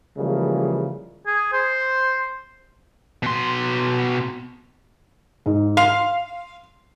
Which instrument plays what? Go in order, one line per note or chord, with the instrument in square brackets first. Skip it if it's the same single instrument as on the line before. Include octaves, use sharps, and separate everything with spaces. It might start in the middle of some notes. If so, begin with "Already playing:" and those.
[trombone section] C#3 E3 F3 G3 G#3 A#3
[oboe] G#4
C5
[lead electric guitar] B2 C6
[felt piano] G#2
[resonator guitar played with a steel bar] F5 [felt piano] C6